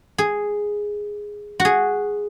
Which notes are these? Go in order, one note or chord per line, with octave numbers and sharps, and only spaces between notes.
G#4
F#4
G#4